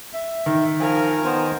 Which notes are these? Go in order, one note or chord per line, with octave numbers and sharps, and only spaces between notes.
E5
D#3
F3 A#4 G#5
D#3 B3 C5